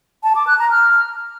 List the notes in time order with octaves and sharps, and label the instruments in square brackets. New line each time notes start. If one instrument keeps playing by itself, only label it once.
[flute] A5
D6
F#6
A#5
F6